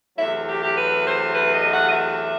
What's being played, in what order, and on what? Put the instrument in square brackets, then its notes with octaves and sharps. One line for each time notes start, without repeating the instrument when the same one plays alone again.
[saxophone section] E2 C3 F#3 A3 E5
G4
G4
B4
C5
B4
D#5
F#5
D#5
E5